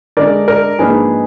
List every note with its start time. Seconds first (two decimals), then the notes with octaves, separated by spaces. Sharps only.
0.17 D3 G#3 D4 A#4 D5
0.48 A#4 D5
0.79 G#2 F3 A#3 D4 G#4 B4